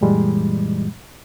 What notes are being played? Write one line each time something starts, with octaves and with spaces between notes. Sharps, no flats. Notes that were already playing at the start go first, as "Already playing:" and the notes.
F#2 A#2 E3 G3 G#3